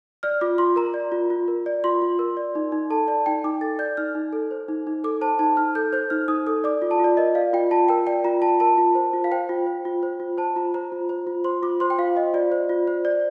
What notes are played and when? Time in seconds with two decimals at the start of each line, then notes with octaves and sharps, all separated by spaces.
0.23 D5 F6
0.41 F4 D6
0.58 F4 C6
0.76 A#4 A#5
0.94 D5
1.12 F4
1.30 F4
1.48 A#4
1.66 D5
1.84 F4 C6
2.02 F4
2.19 A#4
2.37 D5
2.55 D#4
2.72 D#4
2.90 A4 A5
3.08 D5 A5
3.26 D#4 G5
3.44 D#4 D6
3.61 A4 A6
3.79 D5 G6
3.97 D#4 F6
4.15 D#4
4.33 A4
4.51 C5
4.68 D#4
4.87 D#4
5.04 A4 D6
5.21 C5 A5
5.39 D#4 A5
5.57 D#4 F6
5.75 A4 G6
5.93 C5 G6
6.10 D#4 F6
6.28 D#4 D#6
6.47 A4 D#6
6.64 D5 D6
6.82 F4
6.91 A5
6.99 F4 D5
7.17 A#4 D#5
7.35 D5 F5
7.53 F4 G5
7.71 F4 A5
7.88 A#4 G5
8.07 D5 G5
8.24 F4 A#5
8.42 F4 A5
8.60 A#4 A5
8.78 F4
8.95 C5
9.13 F4
9.24 F5
9.31 C5 G5
9.49 F4
9.66 C5
9.85 F4
10.03 C5
10.20 F4
10.38 C5 A5
10.56 F4 A#5
10.74 C5 A#5
10.92 F4
11.09 C5
11.27 F4
11.44 C5 C6
11.62 F4 D6
11.80 C5 C6
11.90 G5
11.98 F4 F5
12.16 C5 D#5
12.33 F4 D5
12.52 C5
12.69 F4
12.87 C5
13.05 D5